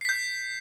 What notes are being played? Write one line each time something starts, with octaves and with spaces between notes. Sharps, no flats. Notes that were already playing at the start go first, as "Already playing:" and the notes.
G6 B6 C7